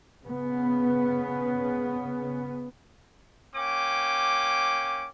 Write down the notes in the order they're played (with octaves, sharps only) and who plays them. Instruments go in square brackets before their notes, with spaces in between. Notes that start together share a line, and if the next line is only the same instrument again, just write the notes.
[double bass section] C#3 B3
[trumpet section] A#3 C#4 G5 D6